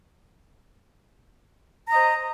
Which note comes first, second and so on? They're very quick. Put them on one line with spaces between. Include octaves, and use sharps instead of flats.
A#5 D#5 C5